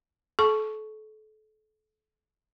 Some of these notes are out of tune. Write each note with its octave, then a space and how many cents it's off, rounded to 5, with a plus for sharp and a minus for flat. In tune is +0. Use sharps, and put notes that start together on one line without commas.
A4 -30 A5 -25 C#6 +0